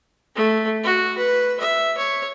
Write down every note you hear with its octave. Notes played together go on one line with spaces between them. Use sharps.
A3
F#4
B4
E5
C#5